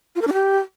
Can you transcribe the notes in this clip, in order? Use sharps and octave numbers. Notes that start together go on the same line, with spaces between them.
F4
A#4
D4
G4